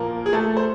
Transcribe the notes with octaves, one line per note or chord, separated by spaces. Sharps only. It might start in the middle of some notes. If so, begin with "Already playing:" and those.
Already playing: A#2 F3 A#3 A#4
G#4
A3 A4
C5